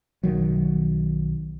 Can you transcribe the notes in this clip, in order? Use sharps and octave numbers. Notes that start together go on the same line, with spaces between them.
B1 D#3 F#3